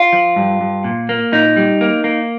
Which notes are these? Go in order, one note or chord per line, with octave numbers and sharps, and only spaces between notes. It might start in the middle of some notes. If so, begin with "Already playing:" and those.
Already playing: F4
F3
G2
G2
A#2
A#3
A#2 D#4
G3
A#3
A#3